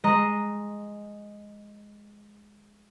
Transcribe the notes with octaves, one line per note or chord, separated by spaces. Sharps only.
G#3 D#5 A#5